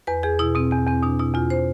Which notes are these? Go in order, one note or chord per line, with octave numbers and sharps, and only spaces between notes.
E2 B4
E2 G#4
B2 E4
B2 C4
E2 C4
E2 C4
B2 D4
B2 E4
E2 F4
C5